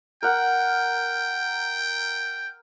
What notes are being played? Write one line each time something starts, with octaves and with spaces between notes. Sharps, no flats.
A#4 F#5 G5